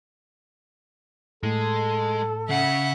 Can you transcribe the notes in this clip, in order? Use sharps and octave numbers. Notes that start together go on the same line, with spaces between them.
A2 G#3 A4
C#3 E5 F#5